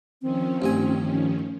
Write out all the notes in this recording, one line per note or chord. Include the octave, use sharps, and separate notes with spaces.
D#3 F3 C4 C#4
A1 G2 G#5